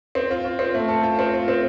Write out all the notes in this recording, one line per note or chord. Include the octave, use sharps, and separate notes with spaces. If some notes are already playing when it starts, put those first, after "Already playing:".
C4
F4
F4
C4
A3
A4
F4
C4
F4
C4